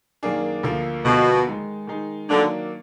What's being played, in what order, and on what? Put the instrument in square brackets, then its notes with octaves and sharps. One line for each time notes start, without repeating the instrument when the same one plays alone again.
[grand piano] F#2 D#3 A#3 D4 G#4
D2 D3 F3 A#3
[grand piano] D2 D3 F3 A#3 [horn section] B2
[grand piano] D#3 G#3 D#4 G#4
D#3 G#3 D#4 G#4
[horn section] D3 [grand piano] D#3 F#3 A#3 D4